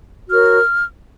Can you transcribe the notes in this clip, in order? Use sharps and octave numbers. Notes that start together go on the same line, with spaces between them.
F#4 A#4 C#5 F6